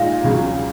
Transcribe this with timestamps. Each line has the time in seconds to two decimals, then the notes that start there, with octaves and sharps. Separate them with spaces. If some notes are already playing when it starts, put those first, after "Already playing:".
Already playing: A#2 G#3 D#4 F5
0.24 C#2 C#3 F#3